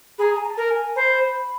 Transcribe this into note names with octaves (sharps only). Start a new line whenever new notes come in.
G#4 A#5 B5
G#5
A#5
A5
A#4
G#5
C5 B5